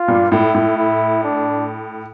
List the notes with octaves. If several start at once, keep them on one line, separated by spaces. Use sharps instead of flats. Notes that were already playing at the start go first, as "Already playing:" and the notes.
Already playing: F4
G2 A#2
A2 E4
A2
E4
D4